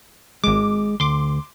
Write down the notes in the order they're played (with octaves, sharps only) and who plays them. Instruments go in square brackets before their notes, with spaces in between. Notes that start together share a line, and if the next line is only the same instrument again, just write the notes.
[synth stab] G#1 D6 [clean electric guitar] G#3
[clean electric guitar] D2 [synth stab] C6 D6